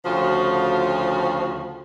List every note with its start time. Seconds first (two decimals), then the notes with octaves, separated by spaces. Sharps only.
0.04 D2 C#3 F3 F4 F#4